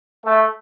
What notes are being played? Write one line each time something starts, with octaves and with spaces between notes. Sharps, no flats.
A3